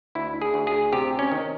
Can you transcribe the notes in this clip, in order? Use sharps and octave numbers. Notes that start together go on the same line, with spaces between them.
D2 E4
G#4
D2
G#4
C3 G4
C#4
D#3